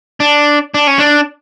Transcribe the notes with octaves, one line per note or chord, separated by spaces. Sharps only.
D4
D4
C#4
D4